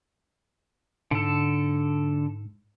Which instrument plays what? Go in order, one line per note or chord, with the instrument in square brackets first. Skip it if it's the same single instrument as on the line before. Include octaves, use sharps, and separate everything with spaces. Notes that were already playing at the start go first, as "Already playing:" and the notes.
[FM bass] G#2 [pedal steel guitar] D3 A4